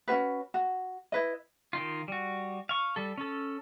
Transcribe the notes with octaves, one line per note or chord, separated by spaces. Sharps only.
C#4 F4 F#4 B4
F#4
E4 B4 D#5
D#3 D#4 F4
G3 F#4
F5 C#6
G3 A4
C#4 A4